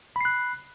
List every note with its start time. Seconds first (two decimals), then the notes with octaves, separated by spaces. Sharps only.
0.16 B5
0.21 C7
0.25 F#6